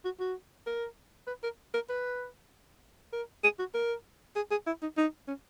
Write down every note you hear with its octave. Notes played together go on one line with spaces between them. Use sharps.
F#4
F#4
A#4
B4
A#4
A#4
B4
A#4
G#4
F#4
A#4
G#4
G#4
E4
D#4
D#4
C#4